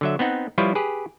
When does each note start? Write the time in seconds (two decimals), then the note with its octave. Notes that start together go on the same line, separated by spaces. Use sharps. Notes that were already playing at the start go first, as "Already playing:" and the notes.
0.01 D3 F#3 E5
0.19 B3 C4 D#4 F#5
0.58 F3 G3 E4 F4 B4 C#5
0.75 G4 G#4 B4